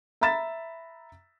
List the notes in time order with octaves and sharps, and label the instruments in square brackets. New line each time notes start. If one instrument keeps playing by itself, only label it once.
[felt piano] E5 A#5 B5 A6 B6 E7